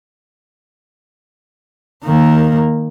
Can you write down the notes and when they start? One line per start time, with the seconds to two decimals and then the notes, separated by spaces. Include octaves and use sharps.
2.04 D#3 A#3